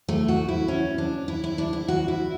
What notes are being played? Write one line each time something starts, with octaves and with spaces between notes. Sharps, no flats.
A3
F#4
E4
C#4
D4
E4
E4
D4
E4
F#4
E4